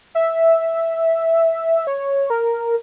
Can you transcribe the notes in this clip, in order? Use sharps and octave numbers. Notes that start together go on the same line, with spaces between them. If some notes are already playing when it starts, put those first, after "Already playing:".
E5
C#5
A#4